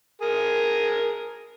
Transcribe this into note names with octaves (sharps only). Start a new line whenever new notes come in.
G#4 A#4